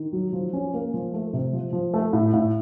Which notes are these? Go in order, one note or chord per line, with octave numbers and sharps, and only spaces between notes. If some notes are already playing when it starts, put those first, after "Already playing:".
Already playing: D#3
F#3
F3
C#4
A#3
F3
A3
C3
F3
F3
A3
A2
A2